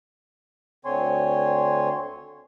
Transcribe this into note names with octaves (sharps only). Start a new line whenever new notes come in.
D2 D3 C4 C#5 G#5 C6